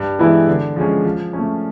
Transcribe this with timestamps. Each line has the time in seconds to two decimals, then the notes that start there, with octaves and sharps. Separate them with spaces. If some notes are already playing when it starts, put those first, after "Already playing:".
Already playing: G2
0.19 E3 G#3 B3 E4
0.47 D3
0.76 F3 G#3 C#4
1.05 F3
1.33 A3 C#4